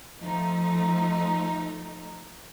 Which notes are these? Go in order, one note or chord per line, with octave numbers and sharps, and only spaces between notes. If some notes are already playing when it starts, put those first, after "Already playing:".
F3 A3 D#4